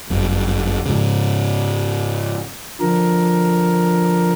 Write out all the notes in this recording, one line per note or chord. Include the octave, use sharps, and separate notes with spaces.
G1 F#2
G#2 C#3
D3 F3 A#4